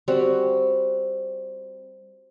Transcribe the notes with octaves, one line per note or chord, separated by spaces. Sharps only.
G3 C4 F#4